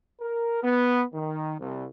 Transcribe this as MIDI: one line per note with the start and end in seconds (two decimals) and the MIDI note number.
0.21 0.60 70
0.62 1.03 59
1.13 1.55 51
1.60 1.85 36